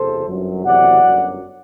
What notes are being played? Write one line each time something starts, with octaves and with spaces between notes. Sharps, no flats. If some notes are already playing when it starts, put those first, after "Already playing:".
Already playing: F#1 E2 C3 E3 A4 C5
G1 F#2 F#3
F#1 E2 C3 F#3 D5 F#5
G1 F#2 F#3